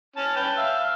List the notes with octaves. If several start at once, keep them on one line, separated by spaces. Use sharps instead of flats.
C#4 A5
B4 G5 A5
E5 F5